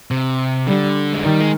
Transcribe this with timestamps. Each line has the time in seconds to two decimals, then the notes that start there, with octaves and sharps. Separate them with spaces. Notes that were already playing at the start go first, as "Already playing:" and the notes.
0.11 C3
0.67 D3 G3
1.13 G#3
1.23 D#3 G3
1.40 G#3